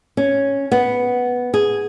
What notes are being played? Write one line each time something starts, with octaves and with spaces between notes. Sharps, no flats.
C#4
B3
G#4